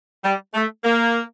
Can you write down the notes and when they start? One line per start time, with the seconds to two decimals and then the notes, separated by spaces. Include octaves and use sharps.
0.24 G3
0.54 A3
0.84 A#3